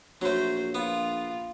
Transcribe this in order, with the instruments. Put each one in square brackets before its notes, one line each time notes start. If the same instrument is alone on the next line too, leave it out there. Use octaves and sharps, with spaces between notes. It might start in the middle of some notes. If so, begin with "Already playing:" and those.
[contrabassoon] A#1 [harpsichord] F#3 A3 [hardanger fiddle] C5
[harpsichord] B3 [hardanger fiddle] F4